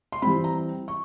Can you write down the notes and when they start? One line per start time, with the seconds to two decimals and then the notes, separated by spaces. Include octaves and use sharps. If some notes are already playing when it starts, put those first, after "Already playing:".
0.12 C6
0.22 E3 G3 C4 B5
0.44 A#5
0.88 C#6